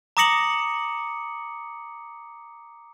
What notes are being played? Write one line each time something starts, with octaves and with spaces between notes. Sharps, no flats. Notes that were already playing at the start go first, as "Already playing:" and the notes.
A#5 D6 D#6 A#6 C#7 F#7